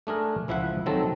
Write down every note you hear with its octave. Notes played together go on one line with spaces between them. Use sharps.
A3 D4 G#4 A#4
C#2 F3 E4 E5 F#5
D#3 F#3 C4 A4